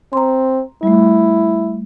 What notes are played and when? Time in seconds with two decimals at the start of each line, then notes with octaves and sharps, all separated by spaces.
0.13 C4 A#5 C6
0.83 G3 A3 E4